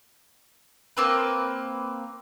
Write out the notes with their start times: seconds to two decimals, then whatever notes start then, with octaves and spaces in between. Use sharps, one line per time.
0.97 A#3 C4 B4